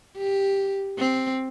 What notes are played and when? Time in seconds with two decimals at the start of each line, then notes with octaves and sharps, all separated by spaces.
0.18 G4
0.98 C4